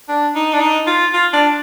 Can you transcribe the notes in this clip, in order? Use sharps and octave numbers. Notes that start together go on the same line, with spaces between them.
D4
D#4
D4
D#4
F4
F4
D4